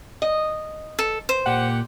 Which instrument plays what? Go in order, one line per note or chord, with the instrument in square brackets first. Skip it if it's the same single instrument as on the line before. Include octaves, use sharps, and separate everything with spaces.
[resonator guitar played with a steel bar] D#5
[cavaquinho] A4
C5
[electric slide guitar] A#2 [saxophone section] G4 F#5